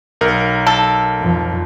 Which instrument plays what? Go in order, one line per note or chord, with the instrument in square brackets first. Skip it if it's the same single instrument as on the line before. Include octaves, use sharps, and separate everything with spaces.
[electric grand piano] B1 A#4
[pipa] A4
[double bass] F2 F3